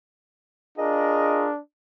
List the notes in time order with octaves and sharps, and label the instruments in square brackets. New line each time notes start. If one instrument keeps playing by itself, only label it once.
[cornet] D4 [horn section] F4 G#4 A#4 [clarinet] D#5